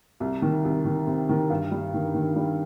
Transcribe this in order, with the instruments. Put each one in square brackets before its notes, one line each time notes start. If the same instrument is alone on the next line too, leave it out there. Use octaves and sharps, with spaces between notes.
[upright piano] C2
D#3
C2
D#3
C3
D#3
G2
G3
D#3
D#3
G3